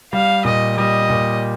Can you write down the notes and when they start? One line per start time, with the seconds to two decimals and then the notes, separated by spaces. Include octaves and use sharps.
0.13 G3 F5
0.45 A#2 D#5
0.77 G3 D#5
1.10 A#2